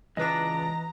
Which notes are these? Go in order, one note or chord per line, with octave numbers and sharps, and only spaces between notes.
C#2 E3 D4 B4 D#5 A#5 A#6